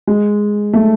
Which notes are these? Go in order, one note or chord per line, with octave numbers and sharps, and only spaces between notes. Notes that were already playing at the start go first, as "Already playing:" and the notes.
G#3
A3